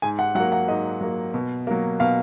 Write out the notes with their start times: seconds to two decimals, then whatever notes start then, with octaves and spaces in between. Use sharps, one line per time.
0.02 G#2 G#5
0.19 F#5
0.35 F#3 F#5
0.40 A#3
0.52 F#5
0.68 G#2 D#5
1.01 F#3 A#3
1.34 B2
1.67 F#3 A#3
2.00 B2 F5